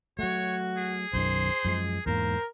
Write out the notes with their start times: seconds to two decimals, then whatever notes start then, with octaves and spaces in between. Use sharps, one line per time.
0.19 F#3 A3 F#4 C#5
0.77 G#4
1.13 B1 F#2 D#3 C5
1.65 F#2 F3 G#3
2.06 E2 G#2 A#3 A#4 C5